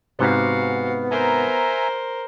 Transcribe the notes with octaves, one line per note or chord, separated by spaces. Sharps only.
G#2 C3 B3 F#4 F5
A#4 C5 E5 G#5 A#5